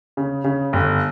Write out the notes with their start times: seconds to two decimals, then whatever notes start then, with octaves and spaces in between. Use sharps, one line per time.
0.17 C#3
0.44 C#3
0.73 G1